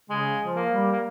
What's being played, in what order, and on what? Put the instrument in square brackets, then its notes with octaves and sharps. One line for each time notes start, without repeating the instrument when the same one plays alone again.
[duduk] C#3 [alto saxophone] G#3
[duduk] F3
[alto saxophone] A#3
[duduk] G3
[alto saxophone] A#3